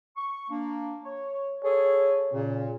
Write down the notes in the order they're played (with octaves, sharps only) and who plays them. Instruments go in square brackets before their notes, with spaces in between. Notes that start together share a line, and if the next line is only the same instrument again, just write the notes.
[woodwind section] C#6
A#3 D4
C#5
[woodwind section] G#4 A4 [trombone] C#5
[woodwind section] A#2 [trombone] C#3